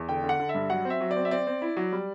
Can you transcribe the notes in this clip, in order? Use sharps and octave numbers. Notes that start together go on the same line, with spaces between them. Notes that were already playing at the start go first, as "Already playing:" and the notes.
Already playing: E2
D3 G5
D3
F#5
D3
E5
G2
F#3 F#5
C4
E5
F#3
D5
C4
E5
C4 D5
C4
E4
F#3
G3